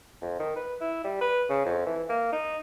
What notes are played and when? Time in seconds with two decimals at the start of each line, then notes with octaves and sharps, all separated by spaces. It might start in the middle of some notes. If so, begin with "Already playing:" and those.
0.22 F2
0.39 D#3
0.56 B4
0.81 E4
1.04 G3
1.21 B4
1.50 C#3
1.65 F2
1.86 E3
2.09 A#3
2.32 D#4